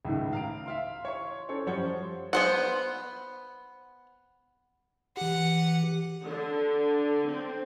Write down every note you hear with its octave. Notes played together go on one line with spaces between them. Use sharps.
C#2 A2 D#3
F5 A#5 D7
E5 F5 C6
C#5 C6 C#6
C#4 A4 C5 C#5
F#2 F3 G3 C5 C#5 F#5
B3 C5 F#5
E3 G4 F#5
D3
C4